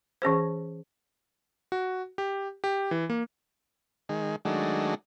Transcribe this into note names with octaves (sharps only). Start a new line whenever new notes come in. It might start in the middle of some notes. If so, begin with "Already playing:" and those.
E3 C#4 G#4 C5
F#4
G4
G4
E3
A#3
D#3 G#3
D#3 F#3 G#3 A3 D4